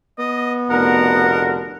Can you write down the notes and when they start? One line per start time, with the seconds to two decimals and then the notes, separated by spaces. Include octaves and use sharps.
0.18 B3 D#5
0.70 F1 B2 D3 A#4 F#5